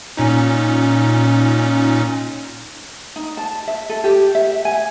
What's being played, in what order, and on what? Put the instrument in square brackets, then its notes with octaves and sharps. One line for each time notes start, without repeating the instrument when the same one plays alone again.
[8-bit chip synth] A#2 C#4 D#4
[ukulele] D#4
A5
E5
A4
G4
E5
G#5